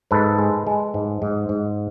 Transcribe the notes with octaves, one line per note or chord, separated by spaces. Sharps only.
G#2 A4 B4
G#3
G#3
G#2
G#2
G#2